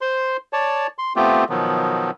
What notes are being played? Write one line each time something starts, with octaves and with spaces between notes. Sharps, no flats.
C5 C6
C#5 D5 A5
C6
A3 B3 C4 F4 G4
B2 D#3 F3 F#3 B3